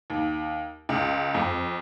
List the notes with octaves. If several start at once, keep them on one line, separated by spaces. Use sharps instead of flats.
D#2
C#2
F2